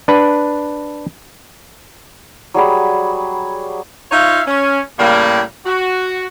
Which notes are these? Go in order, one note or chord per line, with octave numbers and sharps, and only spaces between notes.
D4 B4
F#3 G3 G#4 B5
D#4 F4 C#5 E5 F5
C#4
A2 C#3 G3 A#3
F#4